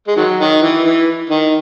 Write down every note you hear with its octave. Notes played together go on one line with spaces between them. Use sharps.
G#3
D#3 F#3
D#3
E3
E3
D#3